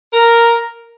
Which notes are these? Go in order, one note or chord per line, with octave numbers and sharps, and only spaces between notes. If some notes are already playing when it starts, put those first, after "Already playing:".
A#4